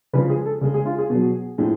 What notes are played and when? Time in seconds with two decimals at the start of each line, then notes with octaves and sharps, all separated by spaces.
0.13 C#3 F3 G#3 B4
0.30 G#4
0.46 A4
0.61 C#3 G#3
0.74 G#4
0.85 F4
0.99 G#4
1.10 B2 F#3
1.58 A2 F3 G#3